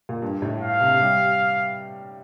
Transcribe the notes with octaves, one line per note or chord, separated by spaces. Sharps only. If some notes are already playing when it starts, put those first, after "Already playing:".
A#2
G2
A2
F5
C3
G3